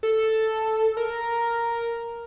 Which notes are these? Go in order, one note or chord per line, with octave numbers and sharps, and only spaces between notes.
A4
A#4